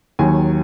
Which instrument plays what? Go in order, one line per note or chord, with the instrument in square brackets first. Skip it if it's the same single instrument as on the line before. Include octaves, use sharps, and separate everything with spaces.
[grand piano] D#2 D#3 F#3 G#5